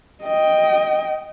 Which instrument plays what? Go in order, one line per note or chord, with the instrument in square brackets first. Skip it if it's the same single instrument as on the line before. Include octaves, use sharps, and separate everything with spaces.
[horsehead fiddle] D#5 G5